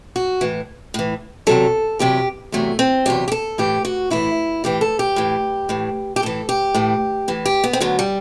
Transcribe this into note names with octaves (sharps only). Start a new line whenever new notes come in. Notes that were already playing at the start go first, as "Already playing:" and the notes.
F#4
A2 E3
A2 E3
E2 C3 F#3 A4
E2 C3 F#3 G4
E2 C3 F#3 A3
C4
E2 C3 F#3 G4
G4
A4
A2 E3 G4
F#4
A2 E3 E4
A2 E3 G4
A4
G4
A2 E3
A2 E3
G4
A2 E3 A4
G4
A2 E3
A2 E3
G4
B3
C4
D2 D3 F#3 B3
G3